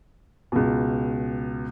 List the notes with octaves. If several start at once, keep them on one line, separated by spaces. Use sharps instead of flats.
C#2 B2